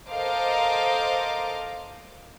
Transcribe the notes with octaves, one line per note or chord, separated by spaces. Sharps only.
A4 A#4 C5 D#5 F5 D6